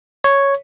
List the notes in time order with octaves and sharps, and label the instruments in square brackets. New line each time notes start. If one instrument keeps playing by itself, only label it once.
[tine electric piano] C#5